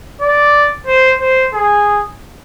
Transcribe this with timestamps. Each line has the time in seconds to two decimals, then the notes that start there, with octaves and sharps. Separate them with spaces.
0.21 D5
0.87 C5
1.21 C5
1.54 G#4